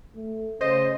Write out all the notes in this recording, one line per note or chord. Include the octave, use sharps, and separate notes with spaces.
A3
C#3 C5 D#5